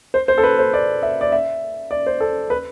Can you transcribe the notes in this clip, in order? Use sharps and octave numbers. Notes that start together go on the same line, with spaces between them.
C5
C5
A4
B4
C5
D5
E5
D5
E5
D5
C5
A4
B4